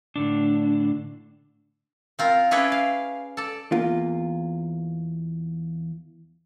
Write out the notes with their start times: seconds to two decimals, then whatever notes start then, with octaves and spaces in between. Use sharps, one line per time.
0.16 A2 D3 D4
2.19 C4 F4 A#4
2.51 C#4 E4 G#4 B4 C#5 D5
2.72 F5
3.37 A4 D5
3.72 E2 A#3 F4